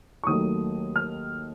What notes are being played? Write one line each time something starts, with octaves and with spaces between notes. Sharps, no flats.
C#6
D#2 D#3 F#3 A3 D#6
F6